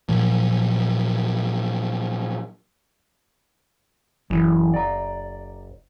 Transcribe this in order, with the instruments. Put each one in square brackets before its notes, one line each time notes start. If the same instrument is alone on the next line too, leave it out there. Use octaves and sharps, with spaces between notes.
[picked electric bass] A#2 F3 F#3
[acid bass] F#1 [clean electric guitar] F#2 E3
[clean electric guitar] D5 A#5